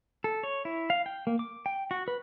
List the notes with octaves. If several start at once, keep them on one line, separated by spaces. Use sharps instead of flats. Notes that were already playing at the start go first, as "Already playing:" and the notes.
A4
C#5
E4
F5
G5
A#3
D6
G5
F#4
B4